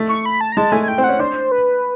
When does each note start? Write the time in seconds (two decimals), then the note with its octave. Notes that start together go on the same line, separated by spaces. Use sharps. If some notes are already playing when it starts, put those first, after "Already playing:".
Already playing: A3
0.09 C#6
0.26 B5
0.41 A5
0.52 A#5
0.57 G#3 A5
0.72 A3 G#5
0.83 G#5
0.88 G5
0.98 C4
1.04 C#4 F#5
1.19 D4 C5
1.52 B4